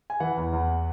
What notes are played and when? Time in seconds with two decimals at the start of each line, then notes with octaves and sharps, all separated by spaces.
0.10 G#5
0.20 E3 F#5
0.37 E2
0.53 E2